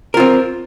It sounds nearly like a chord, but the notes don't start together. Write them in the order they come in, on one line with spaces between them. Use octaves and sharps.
A#4 F4 C4